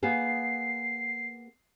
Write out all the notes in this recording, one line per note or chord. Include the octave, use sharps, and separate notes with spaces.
A#3 B3 G#4 C7